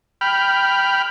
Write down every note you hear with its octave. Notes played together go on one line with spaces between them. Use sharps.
G5 B5 F6